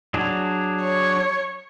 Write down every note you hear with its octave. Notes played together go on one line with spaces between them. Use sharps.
F#3 D4 G#4
C#5